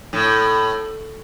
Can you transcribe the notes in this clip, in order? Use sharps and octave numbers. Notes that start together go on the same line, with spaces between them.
A2